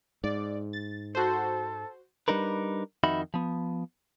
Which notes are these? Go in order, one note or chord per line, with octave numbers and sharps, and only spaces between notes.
G#2 D5
A6
F#4 A4 C5
G3 D4 D#4 A#4 B4
F2 D#3 D#4 F#4 E5 B5
F3 B3